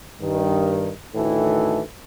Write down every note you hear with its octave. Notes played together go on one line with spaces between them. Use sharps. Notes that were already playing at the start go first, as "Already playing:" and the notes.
G2 D#3
D2 A2 D#3 E3 E4 A4